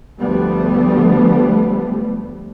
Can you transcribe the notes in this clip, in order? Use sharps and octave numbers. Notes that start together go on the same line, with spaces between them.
D2 F3 G3 A3 B3